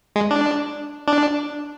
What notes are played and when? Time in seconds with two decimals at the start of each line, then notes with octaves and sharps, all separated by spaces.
0.16 G#3
0.31 D4
1.08 D4